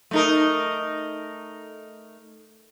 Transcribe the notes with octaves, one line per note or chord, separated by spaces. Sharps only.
A3 D#4 A#4